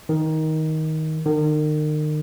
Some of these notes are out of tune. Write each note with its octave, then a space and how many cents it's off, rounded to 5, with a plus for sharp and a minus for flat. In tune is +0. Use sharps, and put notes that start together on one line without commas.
D#3 +15
D#3 -35